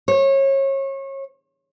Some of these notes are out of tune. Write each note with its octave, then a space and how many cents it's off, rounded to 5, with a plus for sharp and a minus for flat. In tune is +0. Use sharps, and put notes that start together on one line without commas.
C#5 -30